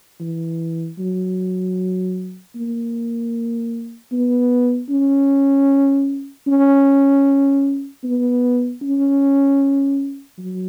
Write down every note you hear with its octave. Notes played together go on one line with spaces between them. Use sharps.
E3
F#3
A#3
B3
C#4
C#4
B3
C#4
F#3